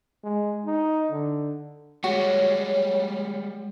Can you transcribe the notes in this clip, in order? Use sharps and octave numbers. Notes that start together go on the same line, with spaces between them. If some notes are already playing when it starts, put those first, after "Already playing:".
G#3
D#4
D3
G3 G#3 F#4 C#5